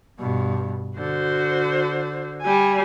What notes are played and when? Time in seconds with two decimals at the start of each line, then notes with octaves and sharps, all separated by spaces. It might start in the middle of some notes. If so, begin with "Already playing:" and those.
0.19 G2 B2
0.98 D3 F#4 C5
2.42 G3 G#5